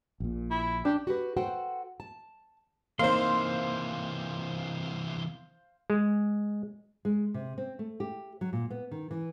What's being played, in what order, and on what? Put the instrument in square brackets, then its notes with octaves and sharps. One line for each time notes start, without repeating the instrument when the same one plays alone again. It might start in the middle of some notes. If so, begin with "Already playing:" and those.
[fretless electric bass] A#1 A#2
[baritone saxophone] E4
[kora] D4 [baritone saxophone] G4
[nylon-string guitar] F#4 G4 B4
F#4 A4 C5 F#5 G5
A5
[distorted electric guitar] C3 E3 [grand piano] A#3 C4 D#4 [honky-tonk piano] C5 F5 [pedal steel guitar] C6
[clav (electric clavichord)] G#3
[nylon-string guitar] G#3
C3
C4
A3
G4
F#3
A#2
B3
D#3
E3